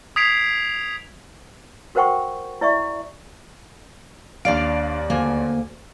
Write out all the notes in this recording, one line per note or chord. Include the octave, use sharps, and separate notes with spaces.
D#6 G#6 B6 C7 D7 F7
F#4 A#4 C5 F#5 G5 C#6
E4 D5 E5 C#6
D#2 D4 D5 F5 D7
D2 A#3 G#5